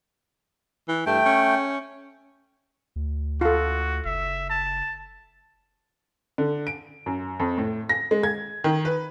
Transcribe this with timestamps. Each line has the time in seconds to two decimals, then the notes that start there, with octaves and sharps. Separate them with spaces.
0.88 E3
1.06 G2 A3 G5
1.26 C#4
2.96 D2
3.41 F4 F#4 A4
4.05 F#1 E5
4.49 A5
6.38 D3
6.67 D7
7.06 F#2
7.40 F2
7.58 A2
7.89 A#6
8.11 G#3
8.23 G#6
8.64 D#3
8.85 B4